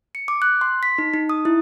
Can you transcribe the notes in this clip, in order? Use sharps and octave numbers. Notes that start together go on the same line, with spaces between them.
C#7
D6
F#6
C6
B6
D#4
D#4
D#6
E4